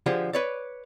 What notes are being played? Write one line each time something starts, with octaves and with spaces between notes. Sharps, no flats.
D3 F3 G4 G#4
B4 C#5 D5